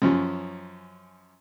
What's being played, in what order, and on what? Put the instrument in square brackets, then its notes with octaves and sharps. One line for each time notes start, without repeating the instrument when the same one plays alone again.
[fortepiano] F#2 F3 C#4